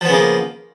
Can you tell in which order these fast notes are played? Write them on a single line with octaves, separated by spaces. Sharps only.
F3 B3 C#3 A#3